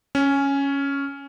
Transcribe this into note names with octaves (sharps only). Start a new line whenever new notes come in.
C#4